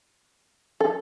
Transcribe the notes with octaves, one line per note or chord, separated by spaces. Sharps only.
A4